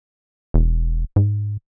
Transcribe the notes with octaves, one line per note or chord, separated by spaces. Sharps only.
E1
G#2